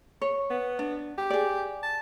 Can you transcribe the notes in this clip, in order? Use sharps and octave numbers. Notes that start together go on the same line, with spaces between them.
C#5
B3
D4
G4
G#4 D5
A5